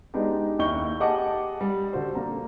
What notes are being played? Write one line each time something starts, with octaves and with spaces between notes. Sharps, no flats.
G#3 B3 D4 D#4 G4
D#2 E4 D#5 C#6 G6 G7
G4 G#4 D#5 F#5 A5 D6
G3
D3 F#4 C5
A#3 A#5